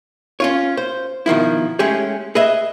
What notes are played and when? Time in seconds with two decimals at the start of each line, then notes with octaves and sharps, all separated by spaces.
0.40 C#4 F4 C#5
0.77 C5
1.26 B2 D#3 F3 E4
1.79 G#3 A3 C#4 G4 G#4
2.35 G#4 B4 D#5 E5